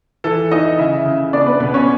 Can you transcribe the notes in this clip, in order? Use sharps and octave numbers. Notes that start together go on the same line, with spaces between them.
E3 A4
E3 D#4 D#5
C#3 E4 E5
C#3
B3 D4 D5
B3 B4
B2 B3 B4
C#4 C#5